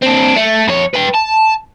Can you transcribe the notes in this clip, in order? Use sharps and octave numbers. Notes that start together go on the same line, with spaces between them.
C4 D4
A3
F2 C#5
B4 G5
A5